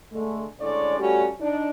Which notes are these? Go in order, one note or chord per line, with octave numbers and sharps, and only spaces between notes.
D3 G#3 A3
A2 D3 G#3 C#4 C#5 D5
G3 A3 C#4 F#4 G4
D4 D#4